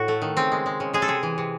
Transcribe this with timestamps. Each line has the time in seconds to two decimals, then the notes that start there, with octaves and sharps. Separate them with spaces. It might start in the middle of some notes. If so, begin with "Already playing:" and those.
Already playing: A2 F#4
0.08 A3
0.22 D#3
0.37 C#3 C4
0.52 G#3
0.66 G#3
0.80 C#3
0.93 G#3 G#4
1.02 A4
1.08 C3 G#4
1.23 E3
1.38 C3